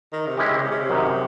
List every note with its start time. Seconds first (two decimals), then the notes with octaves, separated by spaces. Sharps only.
0.13 D#3
0.27 C3
0.37 C#3 G#3 C#4 E4 G4
0.63 C3
0.71 C#3
0.79 C3
0.89 F#2 D#3 F#3